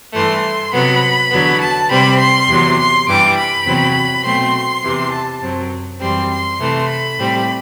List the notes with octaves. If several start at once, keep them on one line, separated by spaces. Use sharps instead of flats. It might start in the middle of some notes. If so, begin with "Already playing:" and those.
G2 E3 A3 C6
C3 F#3 B3 B5
E2 D3 F#3 B3
A5
C3 G3 C4 B5
C6
E2 C3 F#3
C6
G2 E3 G3 D6
B5
E2 C3 F#3 C4
B2 F#3 A3 C4 C6
E2 C3 E3
A5
F#2 F#3 C4
F#2 E3 G3 C4 C6
C6
C3 E3 A3
B5
A2 G3 C4